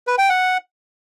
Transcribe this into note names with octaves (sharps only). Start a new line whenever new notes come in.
B4
G5
F#5